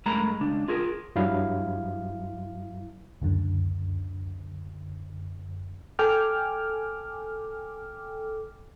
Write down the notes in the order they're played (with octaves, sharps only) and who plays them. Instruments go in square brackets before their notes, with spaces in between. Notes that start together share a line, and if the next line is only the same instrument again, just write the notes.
[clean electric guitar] G2 G#3 A3 A#4 A#5 B5
C#2 D4
F4 G#4 A#4
[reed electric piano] G2 F#3 E4 F5
[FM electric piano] C#2 F#2 D3
A4 G5 G#5 D6 F6